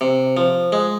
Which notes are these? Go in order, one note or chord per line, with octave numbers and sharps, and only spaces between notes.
C3
F3
G#3